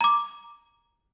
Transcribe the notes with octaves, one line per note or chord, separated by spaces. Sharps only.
A#5 D6